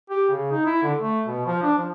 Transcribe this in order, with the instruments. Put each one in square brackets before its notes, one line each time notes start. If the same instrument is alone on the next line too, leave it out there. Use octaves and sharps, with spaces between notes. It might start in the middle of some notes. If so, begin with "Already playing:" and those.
[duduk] G4
C#3
D#4
E4
D3
A3
B2
F3
D4
F3